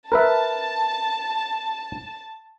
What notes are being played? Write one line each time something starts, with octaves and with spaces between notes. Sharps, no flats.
A#4 B4 E5 A5